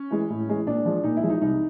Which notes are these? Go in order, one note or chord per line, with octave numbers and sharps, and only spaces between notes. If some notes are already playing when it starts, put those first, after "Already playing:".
Already playing: C#4
E3 G#3
A2
E3 G#3
A#2 D4
F3 G#3
A#2 D#4
E4
F3 G#3
D#4
C2 D#4